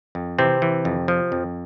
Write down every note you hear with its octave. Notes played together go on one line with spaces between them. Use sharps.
F2
C3 E3 C4
E3
F2
F3
F2